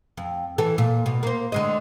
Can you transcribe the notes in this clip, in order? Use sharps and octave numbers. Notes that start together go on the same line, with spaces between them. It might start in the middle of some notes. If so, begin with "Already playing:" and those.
F2
E3 A4
A#2
B2
A#3 C5
D3 G#3 D#5